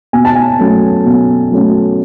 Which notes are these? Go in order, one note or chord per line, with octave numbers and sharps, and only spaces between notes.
B2 G#5
A5
G#5
F#3 A3 C#4
B2
F#3 A3 C#4